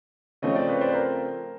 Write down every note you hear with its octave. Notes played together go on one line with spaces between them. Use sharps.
C#3 F3 A3 C4 C#5 D#5
C5 D5
B4 C#5
C5 D5
B4
A#4 C5